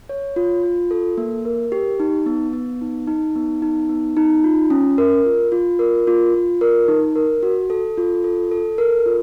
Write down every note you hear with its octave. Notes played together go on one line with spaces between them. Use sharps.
C#5
F4
F4
A4
A#3
A#4
G4
D#4
B3
B3
D#4
D#4
B3
D#4
B3
D#4
F4
C#4
A#4
F4
F4
A#4
F4
F4
A#4
D#4
A#4
F#4
A4
F4
A4
A4
A#4
F4